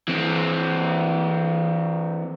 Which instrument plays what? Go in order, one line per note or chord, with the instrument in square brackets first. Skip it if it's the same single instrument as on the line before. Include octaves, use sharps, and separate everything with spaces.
[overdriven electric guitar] E3 C4